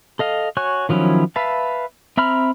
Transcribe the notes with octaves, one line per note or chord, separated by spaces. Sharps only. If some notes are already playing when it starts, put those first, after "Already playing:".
A4 D#5 F5
F#4 C#5 G#5 C#6 F#6
D#3 F3 F#3 C#4 E4
B4 E5 F5 A5
C4 E5 A#5 B5 F6